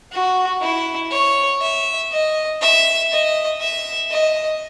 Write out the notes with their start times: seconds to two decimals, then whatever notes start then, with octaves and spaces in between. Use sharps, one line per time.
0.12 F#4
0.61 E4
1.11 C#5
1.61 E5
2.12 D#5
2.62 E5
3.12 D#5
3.61 E5
4.11 D#5